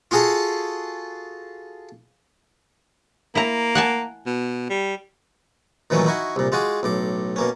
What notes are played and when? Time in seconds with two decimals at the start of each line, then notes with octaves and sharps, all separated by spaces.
0.11 F4 F#4 G#4 A4 A5
3.35 A#3 E4 A#5
3.75 F#5 G#5 A5
4.26 B2
4.70 G3
5.90 A#2 D#3 E3 F#3 A3 C#4
6.06 D#4 E4 F#4 G#5 C#6
6.36 C2 A#2
6.52 G#3 F4 F#4 G#4 D6
6.83 B1 A2 D6
7.36 B2 A#3 C#4